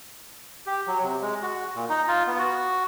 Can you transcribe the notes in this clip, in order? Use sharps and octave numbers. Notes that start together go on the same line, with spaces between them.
G4
F#3
C3
G#3
F#4
A#2
D#4
F4
B3
F#4